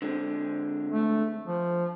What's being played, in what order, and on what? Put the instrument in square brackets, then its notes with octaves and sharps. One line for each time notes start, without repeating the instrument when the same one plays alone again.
[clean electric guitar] D3 G#3 C4
[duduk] A3
F3